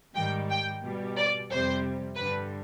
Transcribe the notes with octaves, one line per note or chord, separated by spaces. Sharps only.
G#2 D#3 G3 G5
G5
B2 G3
D5
F2 C3 G3 C5
G2 D3 G3 B4